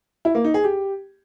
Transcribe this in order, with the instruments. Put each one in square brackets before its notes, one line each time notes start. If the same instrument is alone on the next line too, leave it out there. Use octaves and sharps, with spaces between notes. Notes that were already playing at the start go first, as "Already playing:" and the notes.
[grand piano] E4
A#3
D#4
G#4
G4